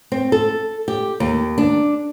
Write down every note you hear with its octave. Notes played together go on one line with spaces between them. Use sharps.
C4
A4
G4
D#2
D4